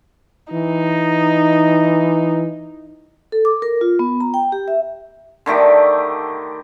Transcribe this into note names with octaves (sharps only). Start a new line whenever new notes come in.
E3 D#4
A4
D6
A#4
F4
B3
A#5
G5
G4
E5
D3 D#3 A3 G4